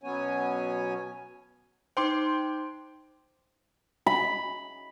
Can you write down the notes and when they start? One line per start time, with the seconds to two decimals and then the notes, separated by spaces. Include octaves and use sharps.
0.04 B2 F#3 B3 C#4 C#5 G#5
1.97 D#4 C5 G5 C6 D6
4.06 B5